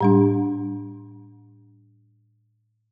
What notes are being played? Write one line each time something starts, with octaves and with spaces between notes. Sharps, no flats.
A2 G3 D4